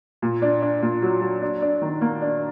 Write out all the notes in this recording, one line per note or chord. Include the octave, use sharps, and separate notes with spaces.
A#2
D4
D4
A#2
F#3
F#3
D4
D4
D#3
A#3
D4